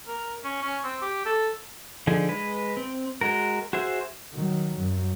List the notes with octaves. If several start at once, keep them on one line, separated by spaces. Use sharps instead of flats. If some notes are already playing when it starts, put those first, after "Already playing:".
A#4
C#4
C#4
C4
G4
A4
D3 F3 D#4 G#4
G#3 B4
C4
G#3 F#4 A#4
F#4 G#4 C5 E5
D#3 F#3
F#2